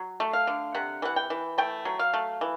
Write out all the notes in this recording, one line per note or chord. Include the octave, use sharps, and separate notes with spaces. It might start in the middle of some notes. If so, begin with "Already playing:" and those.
Already playing: F#3
A3
F5
D3
C3 F#5
E3 F#5
G5
E3
A3 G5
F#3
F5
A3
E3